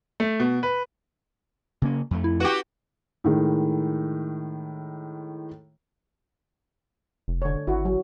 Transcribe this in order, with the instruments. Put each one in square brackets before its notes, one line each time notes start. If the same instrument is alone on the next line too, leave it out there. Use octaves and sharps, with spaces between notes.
[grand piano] A3
B2
B4
[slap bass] C#3 A#3 C#4
F2 A3
[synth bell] E4
[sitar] F#4 G4 [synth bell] B4 F#5
[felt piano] A2 D#3 G#3
[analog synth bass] F1
[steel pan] D3 C#5
[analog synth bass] G#1 [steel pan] E4 F#4
[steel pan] F#3